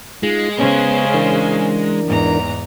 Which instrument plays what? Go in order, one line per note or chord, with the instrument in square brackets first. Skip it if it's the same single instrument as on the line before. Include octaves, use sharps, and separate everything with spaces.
[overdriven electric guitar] G#3 [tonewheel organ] D#4 F4 G#4
[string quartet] C#3 C#4 C5 [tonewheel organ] B3
[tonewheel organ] E3 D4 A#4
[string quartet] E2 G#2 A#5